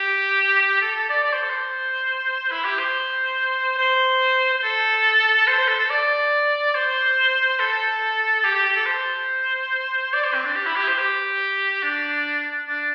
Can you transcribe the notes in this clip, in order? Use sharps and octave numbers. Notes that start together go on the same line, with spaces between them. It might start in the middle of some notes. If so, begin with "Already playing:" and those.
Already playing: G4
A4
A4
D5
D5
C5
A4
C5
E4
G4
C5
C5
C5
A4
C5
C5
A4
A4
D5
C5
A4
G4
G4
G4
A4
C5
D5
C5
C4
D4
G4
E4
G4
C5
G4
D4
D4